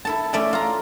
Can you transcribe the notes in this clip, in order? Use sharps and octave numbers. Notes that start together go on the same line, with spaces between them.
E4 A4 A5
A3 C#4 D5 E5 G#5
F4 A#5